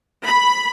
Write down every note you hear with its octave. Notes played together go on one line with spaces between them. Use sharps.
B5